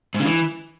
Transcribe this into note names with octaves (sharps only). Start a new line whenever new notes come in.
G#2
C#3
E3